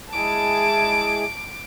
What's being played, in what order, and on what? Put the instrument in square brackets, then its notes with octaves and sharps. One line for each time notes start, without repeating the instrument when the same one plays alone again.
[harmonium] G#3 E4 G#4 [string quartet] A5 [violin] D6